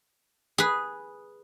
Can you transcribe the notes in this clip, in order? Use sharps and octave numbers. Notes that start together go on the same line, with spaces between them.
G#4 B4